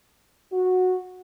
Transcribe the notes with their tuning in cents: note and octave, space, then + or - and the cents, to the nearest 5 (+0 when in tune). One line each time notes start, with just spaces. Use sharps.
F#4 -10